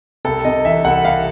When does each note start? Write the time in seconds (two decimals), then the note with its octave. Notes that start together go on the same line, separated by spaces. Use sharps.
0.25 C2 A4
0.45 C3 D#5
0.65 E3 E5
0.85 C2 F#5
1.05 C2 F5